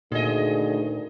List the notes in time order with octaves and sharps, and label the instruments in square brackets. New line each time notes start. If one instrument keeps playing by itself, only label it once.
[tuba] D2 [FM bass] A#2 [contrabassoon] D#3 [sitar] G#4 D#5